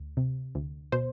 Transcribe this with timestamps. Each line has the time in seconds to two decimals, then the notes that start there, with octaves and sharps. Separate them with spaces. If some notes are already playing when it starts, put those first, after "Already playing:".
Already playing: D2
0.17 C3
0.55 D2
0.92 B2 C5